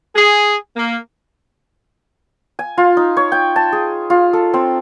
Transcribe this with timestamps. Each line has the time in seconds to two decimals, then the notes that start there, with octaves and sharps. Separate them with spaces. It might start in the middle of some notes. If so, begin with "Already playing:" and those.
0.16 G#4
0.77 A#3
2.59 G#5
2.78 F4
2.97 D#4
3.17 C#5
3.32 G5
3.56 A5
3.73 G#4
4.10 F4
4.33 A4
4.54 C4